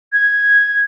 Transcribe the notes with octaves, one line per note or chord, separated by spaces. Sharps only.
G#6